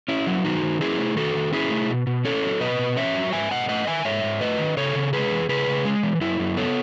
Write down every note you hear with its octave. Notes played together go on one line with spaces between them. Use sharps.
C#4 E4
F#3
D#3 D#4 F#4
D#3
C#4 E4 G#4
A3
D#3 F#4 A4
D#3
C#4 E4 G#4
A3
B2
B2
C#4 A4 C#5
F#3
B2 B4 D#5
B2
C#4 C#5 E5
F#3
G#2 E5 G#5
G#2 D#5 F#5
A3 D#5 F#5
D#3 E5 G#5
G#2 C#5 E5
G#2
A3 B4 D#5
D#3
C#3 A4 C#5
C#3
G#3 G#4 B4
E3
C#3 G#4 B4
C#3
G#3
E3
F#2 E4
F#2
B3 A4 C#5